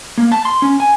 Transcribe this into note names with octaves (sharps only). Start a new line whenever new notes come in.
A#3
A5
C6
C#4
G#5